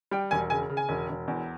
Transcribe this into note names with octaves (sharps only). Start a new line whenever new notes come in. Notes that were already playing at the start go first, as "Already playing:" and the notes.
G3 G5
E1 G#5
C#3 G#5
C#3
G#5
E1
E1
E2